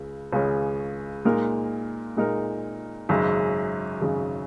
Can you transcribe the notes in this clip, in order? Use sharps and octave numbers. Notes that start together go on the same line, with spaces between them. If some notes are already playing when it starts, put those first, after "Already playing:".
Already playing: C#2 C#3
C#2 C#3 G#3 C#4
A#2 G#3 D#4 A#4
A#2 G#3 D#4 A#4
G#1 F#2 C#3 G#3
G#1 F#2 C#3 G#3